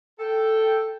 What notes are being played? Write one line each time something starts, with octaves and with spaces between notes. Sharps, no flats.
A4 G5